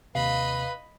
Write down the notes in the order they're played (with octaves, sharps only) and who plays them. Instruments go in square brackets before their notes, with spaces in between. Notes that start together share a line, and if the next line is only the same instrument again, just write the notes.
[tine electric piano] D#2 C3 [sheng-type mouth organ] B4 [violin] D#5 B5 [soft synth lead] F5